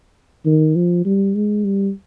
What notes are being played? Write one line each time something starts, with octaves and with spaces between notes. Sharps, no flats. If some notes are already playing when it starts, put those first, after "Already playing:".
D#3
F3
G3
G#3
G3